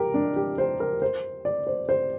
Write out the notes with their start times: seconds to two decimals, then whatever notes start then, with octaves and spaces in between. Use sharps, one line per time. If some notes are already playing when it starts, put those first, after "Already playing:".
Already playing: G4 A#4
0.14 D4
0.36 G4
0.58 C5
0.80 A#4
1.02 C5
1.45 D5
1.67 C5
1.89 C5